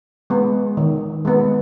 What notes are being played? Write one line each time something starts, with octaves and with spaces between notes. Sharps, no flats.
G#3 B3
D#3
G#3 B3